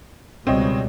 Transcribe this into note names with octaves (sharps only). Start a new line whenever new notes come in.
C#2 B2 G3 C4 C#5 D#5